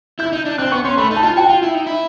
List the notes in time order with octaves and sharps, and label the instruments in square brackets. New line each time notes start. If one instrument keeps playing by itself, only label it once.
[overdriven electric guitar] E4 [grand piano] G6
[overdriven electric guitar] D#4
D4
[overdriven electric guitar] C4 [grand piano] F#6
[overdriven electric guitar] B3 [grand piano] C#6
[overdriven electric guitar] C#4 [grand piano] C6
[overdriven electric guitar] A3 [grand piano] B5
[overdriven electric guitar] D#4
[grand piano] A5
[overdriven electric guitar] F4
[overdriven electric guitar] F#4 [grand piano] G5
[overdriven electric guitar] F4
E4
D#4
E4